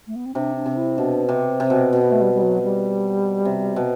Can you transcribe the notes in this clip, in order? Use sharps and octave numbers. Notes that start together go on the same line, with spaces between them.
A3
B3
C4
C3 D4
D4
C3
E4
B2 D4
C3 C4
C3
B2
B2
B3
A3
G3
G3
F#3
G3
C3
B2